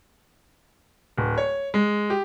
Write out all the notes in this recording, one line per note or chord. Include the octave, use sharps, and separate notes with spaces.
D1
C#5
G#3
G4